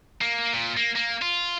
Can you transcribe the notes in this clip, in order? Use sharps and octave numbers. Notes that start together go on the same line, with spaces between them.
A#3
A#2
A#3
A#3
F4